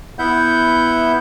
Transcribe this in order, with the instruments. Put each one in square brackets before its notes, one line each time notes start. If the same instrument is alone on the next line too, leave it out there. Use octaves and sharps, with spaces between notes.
[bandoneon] B3 E4 E5 F#5 G6